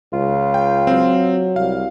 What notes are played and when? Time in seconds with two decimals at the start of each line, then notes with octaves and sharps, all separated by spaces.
0.13 C#2 F4
0.54 G5
0.87 F#3 C4
1.56 C2 F5